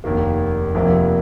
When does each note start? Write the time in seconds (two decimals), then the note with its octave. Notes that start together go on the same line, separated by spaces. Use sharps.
0.04 F1 D#2 D#3 A#3
0.75 F1 F2 C3 F3 A#3